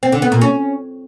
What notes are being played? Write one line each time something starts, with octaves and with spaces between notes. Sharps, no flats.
C4
D3
B3
A#2
C#4